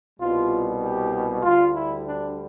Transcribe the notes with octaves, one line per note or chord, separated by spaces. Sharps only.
C2 B2 G3 F4
G4
D2 D3 G3 F4
E4
D4